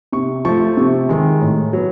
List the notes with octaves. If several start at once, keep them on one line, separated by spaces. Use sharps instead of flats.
C3 C#6
F3 A3 C#6
C3
D#3 G#3
A2
F#3 B3